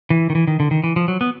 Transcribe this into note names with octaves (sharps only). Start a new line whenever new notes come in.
E3
D#3
E3
D#3
D3
D#3
E3
F3
F#3
B3